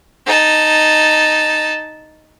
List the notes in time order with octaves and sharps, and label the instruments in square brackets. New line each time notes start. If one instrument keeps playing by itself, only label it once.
[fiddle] D#4 A5